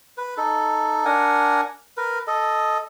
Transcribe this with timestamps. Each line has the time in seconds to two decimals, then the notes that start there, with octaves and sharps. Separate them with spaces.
0.17 B4
0.37 D#4 A4
1.05 D4 A#4 F#5 G#5
1.97 A#4 B4
2.27 A4 D#5